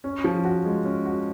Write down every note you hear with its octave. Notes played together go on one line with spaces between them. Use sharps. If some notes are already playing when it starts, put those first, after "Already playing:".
C#4
F3
F#4
G#3
C#4
F#4